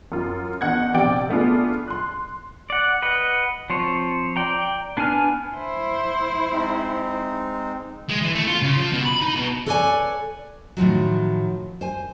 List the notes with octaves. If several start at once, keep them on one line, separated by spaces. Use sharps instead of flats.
F#2 F4
E2 D4 D#5 F#5 G6 G#6
A#1 C3 D5 G5 D7
A3 B3 D4 F4 G#4
C6 F#6
D5 F#5
B4 D#5 F#5
F3 C4 C5 C#5
D5 G5 A#5
B3 D4 B4 G#5 F6
E4 C5
G#3 C4 D#4
G#3
E3
A3
F4
C#3
F3
B2
B5
D#4
B2
A4 B4 C#5 D5 F5 G#5
A2 D#3 F3 F#3
C5 G#5